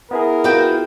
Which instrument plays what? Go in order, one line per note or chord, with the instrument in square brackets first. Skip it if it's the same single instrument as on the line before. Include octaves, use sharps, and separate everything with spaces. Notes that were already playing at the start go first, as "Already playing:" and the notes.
[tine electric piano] B3 E4 G#4 [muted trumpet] A#4
[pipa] A#3 G5 [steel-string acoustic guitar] F4 F#4 B4